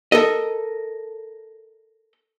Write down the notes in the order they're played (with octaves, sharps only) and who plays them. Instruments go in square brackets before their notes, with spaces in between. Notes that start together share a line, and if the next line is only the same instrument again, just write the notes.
[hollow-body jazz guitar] A4 A#4 D#5